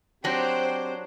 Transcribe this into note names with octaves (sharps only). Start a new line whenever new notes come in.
F#3 C4 D4 G4 C5 G5